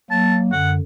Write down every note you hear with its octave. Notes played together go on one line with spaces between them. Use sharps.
F#3 A#3 A5
F#2 D3 F#5